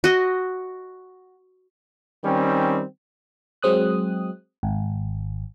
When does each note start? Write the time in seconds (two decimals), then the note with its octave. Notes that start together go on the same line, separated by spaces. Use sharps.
0.04 F#4 D#5
2.24 D#3 G3 C4 C#4
3.63 F#3 G#3 C4 D#6 F#6
4.63 G#1